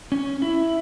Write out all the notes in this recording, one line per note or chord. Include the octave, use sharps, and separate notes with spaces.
C#4
E4